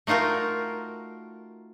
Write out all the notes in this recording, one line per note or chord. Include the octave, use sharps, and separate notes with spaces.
A3 D#4 F4 F#4 A#4